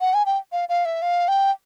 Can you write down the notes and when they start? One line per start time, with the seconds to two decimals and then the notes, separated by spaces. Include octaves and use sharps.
0.01 F#5
0.14 G#5
0.26 G5
0.52 F5
0.69 F5
0.85 E5
1.02 F5
1.28 G5